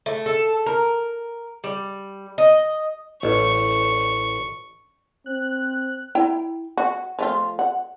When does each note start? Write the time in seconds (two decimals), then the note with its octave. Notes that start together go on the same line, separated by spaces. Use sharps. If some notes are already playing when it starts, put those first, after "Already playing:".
0.06 A3
0.26 A4
0.66 A#4
1.64 G3
2.38 D#5
3.23 A1 C#6
5.26 C4 F#6
6.15 E4 G5 A#5
6.77 F#4
7.19 F3 A3 F4
7.59 F#5